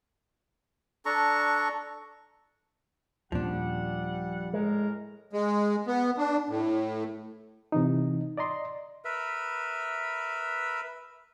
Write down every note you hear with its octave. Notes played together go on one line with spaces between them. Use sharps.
D4 A4 A#5 C#6
D#1 A#2 F3 G3 C#4 D4 F#5
A2 G#3 A#4 A#5
G#3
B3
D4
A2
C3 E3 D#4
D5 D#5 A#5 C6
A#4 B4 E5 B5